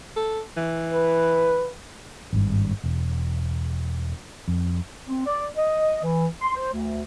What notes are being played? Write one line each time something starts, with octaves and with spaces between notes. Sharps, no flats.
A4
E3
B4
G#1 G2
E1
F2
C4
D5
D#5
E3
C6
C5
D2